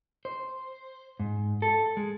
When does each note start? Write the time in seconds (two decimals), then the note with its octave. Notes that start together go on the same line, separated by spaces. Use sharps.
0.25 C5
1.20 G#2
1.62 A4
1.97 G#3